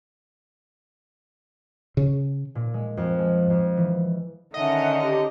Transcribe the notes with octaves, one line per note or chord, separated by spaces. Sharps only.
C#3
A#2
G#3
F2
G#3
F2
E3
D3 D#3 C#4 D#5 E5 F#5
G4 D#5